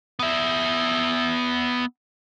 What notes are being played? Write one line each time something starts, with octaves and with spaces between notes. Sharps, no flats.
B3 E5